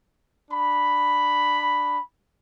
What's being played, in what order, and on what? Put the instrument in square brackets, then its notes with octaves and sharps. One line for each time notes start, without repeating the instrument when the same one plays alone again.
[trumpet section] D4 B5